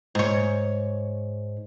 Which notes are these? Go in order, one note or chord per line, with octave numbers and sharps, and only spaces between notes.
G#2 C#5